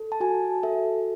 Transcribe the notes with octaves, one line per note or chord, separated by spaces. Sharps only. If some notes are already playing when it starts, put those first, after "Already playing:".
Already playing: A4
A5
F#4 G#5
A4 E5